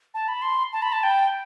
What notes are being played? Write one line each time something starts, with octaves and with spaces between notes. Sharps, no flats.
A5
B5
C6
A5
B5
A5
G5